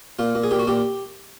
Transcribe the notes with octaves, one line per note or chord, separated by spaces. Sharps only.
A#2 F4
A#2
G#4
A#2 G4
F#4
A#2 G4